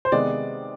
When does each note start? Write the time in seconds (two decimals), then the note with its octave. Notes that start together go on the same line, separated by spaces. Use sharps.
0.05 C5
0.12 C3 D#3 G#3 B3 D5